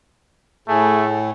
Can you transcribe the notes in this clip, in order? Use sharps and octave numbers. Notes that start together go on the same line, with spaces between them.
A2 A3 G#4